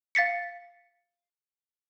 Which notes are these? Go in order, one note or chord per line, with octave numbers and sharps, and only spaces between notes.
F5 A6 B6 C#7